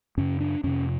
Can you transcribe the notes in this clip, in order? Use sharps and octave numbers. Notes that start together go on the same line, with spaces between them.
F#2 C#3 C#4
D4
F2 C3 C#4